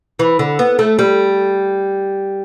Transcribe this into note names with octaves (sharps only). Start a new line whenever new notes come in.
E3
D3
B3
A3
G3